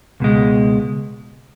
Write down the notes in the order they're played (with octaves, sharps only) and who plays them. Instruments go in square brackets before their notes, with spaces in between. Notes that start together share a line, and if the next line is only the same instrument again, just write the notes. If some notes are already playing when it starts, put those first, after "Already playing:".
[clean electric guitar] C#2 B2 G#3